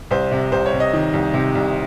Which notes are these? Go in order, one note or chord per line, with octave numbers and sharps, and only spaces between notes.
C2 C5
C3
C2 C5
C#5
C3
D#5
D#3
C2
C3
C2